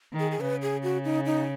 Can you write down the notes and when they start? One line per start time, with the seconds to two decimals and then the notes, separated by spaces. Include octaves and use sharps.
0.13 D#3
0.19 G#4
0.31 G#4
0.41 C#3 B4
0.62 G#4
0.83 F#4
1.05 D#4
1.26 D#4